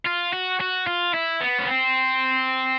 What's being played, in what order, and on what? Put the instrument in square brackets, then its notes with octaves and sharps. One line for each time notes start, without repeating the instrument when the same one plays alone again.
[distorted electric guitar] F4
F#4
F#4
F4
E4
B3
C#4
C4